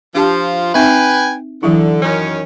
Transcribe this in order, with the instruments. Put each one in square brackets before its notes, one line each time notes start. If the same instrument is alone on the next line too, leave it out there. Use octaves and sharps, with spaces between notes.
[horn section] F3 F4 [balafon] D4 G4 A5
[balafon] C4 D#4 E5 [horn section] B4 G5 G#5
[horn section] D3 [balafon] E3 F#3 E4
[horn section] F#2 D#3 C#4